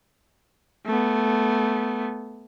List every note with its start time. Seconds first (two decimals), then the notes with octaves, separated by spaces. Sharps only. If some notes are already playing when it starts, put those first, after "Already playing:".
0.86 A3 B3